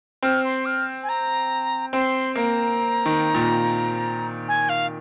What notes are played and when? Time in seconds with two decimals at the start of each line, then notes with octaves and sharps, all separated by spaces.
0.23 C4 F6
0.44 C6
0.65 F6
1.03 G#5
1.09 A#5
1.93 C4 C6
2.35 A#3 A#5
3.06 D#3
3.34 A#2
4.48 G#5
4.69 F5